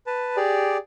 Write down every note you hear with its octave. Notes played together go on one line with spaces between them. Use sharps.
B4 A5
G4 G#4 D5